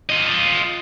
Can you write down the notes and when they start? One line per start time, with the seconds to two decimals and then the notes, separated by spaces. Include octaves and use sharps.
0.10 F4 D#5